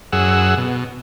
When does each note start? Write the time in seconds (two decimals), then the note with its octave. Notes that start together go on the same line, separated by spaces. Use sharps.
0.13 F#2 G#4 F#5 E6
0.58 B2